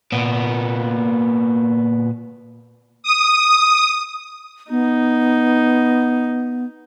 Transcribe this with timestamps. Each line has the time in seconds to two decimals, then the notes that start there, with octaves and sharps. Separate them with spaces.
0.12 A#2 B3
3.03 D#6
4.70 B3 D#4